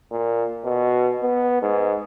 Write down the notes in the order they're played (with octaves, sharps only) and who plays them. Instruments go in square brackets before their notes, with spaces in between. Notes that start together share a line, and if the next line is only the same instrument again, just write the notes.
[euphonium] A#2
B2
B3
G#2